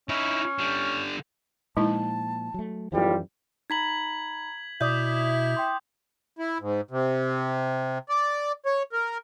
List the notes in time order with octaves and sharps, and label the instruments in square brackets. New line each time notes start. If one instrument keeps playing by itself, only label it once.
[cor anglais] C#4 [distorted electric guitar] D#4 E4
[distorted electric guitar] D3 G3
[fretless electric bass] A#2 F3 [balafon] G#3 D#4 E4 [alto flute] A5
[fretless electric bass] F#3 A3
[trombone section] B1 A2 G3 [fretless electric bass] F#2 E3 F3 [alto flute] F4
[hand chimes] D#4 A#5 B5 [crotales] G#6 B6 F#7
[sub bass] B2 [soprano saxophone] E4 [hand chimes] D5 E5 [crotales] D6 D#6 G6
[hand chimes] G5 C6
[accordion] E4
G#2
C3
D5
C#5
A#4